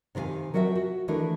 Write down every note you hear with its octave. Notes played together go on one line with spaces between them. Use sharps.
C3 D#3 B4 F5 G#5
F#3 F#4 A#4 E5 F5 G5
F#4
D#3 E3 A3 D4 E4